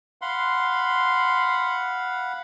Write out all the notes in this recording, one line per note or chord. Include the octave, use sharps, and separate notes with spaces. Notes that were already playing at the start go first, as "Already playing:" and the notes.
F5 F#5 B5 C6